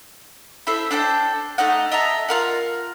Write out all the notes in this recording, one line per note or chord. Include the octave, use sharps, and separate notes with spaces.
E4 A4 C5 E5
D4 A4 C5 G5
A3 D#4 D#5 F#5
D#5 E5 A5 A#5
F4 A#4 F#5